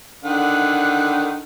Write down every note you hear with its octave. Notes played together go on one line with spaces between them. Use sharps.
D3 D#3 F#5